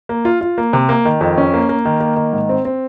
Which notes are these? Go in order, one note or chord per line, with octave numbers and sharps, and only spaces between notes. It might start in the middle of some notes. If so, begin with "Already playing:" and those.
A#3
F4
F4
A#3
C3
A#3
D#3
F2
C#4
A#3
A#3
D#3
A#3
D#3
G#2
C4
C4